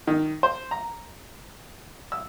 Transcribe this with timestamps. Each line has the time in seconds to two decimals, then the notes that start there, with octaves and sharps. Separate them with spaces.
0.07 D#3
0.43 C5
0.71 A#5
2.12 E6